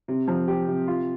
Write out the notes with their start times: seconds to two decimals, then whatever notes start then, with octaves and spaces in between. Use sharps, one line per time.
0.08 C3
0.28 F3
0.48 G4
0.68 C3
0.88 F4